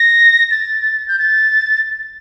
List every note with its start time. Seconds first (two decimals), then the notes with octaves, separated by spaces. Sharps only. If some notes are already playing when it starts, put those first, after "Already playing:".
Already playing: A#6
0.51 A6
1.08 G6
1.19 A6